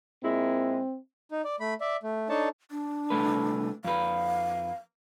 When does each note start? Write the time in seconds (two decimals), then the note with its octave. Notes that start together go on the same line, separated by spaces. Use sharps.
0.24 A#2 G#3 C4 E4
1.31 D#4
1.44 D5
1.60 A3 B5
1.81 D5 E5
2.03 A3
2.29 D4 D#4 A4 C#5 A5
2.71 D4
3.10 C2 A3 B4
3.84 F2 B4 F5